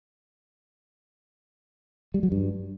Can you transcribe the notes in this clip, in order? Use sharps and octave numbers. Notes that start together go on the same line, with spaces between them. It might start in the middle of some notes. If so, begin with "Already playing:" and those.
G3
F#3
G2